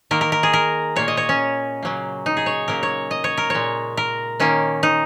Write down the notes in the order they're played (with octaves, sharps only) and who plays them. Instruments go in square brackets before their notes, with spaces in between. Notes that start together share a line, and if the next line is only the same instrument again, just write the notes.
[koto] D#3 A#3 A#4
A#4
A#4
G#4
A#4
A#2 A#3 C#5
D#5
C#5
C#4
C#3 F#3 A#3
D#4
G#4
C#5
C#3 F#3 A#3 A#4
C#5
D#5
C#5
A#4
A#2 G#3 C#5
A#4
D#3 A#3 C#4
D#4